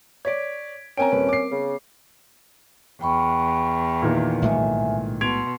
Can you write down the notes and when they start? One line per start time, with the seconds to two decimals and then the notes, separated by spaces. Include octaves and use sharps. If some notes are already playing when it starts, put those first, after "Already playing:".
0.25 C#5 D5 G#6 B6 D7
0.98 C4 C#4 A#4 G5 G#5 A#5 D7
1.12 D#1 B4
1.29 D6 C7
1.51 C#3 B3
3.01 E2 G5 B5 C#6
4.02 A#2 D#3 E3
4.42 B1 A2 G#3 E5 G#5
5.21 B2 C6 G#6 D7 F7